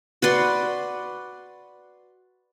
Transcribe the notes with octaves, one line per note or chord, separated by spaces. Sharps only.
F#4 B4 D5 C6